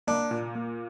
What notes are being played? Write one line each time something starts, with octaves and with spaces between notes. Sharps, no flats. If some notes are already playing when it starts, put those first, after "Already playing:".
A#3 D4
A#2
A#3